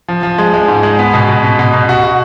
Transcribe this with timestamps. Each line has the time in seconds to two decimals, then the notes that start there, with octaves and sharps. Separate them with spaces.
0.08 F3
0.23 F3
0.38 G#3
0.54 G#3
0.68 G#2
0.83 G#3
0.99 B3
1.14 B2
1.29 B2
1.44 B2
1.59 B2
1.73 B2
1.89 F#4
2.04 F#4